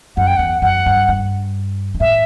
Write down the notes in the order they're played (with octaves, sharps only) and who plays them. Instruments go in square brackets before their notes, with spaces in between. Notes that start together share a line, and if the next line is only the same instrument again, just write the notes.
[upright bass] F#2 [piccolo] F#5
[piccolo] G5
[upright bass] E2 [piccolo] F#5
[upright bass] F#2 [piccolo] F#5
[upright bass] G2
G2
G2
[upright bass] A2 [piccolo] E5